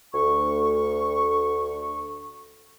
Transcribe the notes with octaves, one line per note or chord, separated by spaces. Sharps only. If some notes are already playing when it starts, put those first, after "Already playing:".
D2 C#6